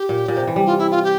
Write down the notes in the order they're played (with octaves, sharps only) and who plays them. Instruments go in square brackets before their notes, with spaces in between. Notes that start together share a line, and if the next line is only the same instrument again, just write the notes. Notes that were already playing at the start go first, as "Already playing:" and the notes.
Already playing: [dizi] G4
[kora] A#2
A#2
C3
E3
G3
[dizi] F4
E4
F4
G4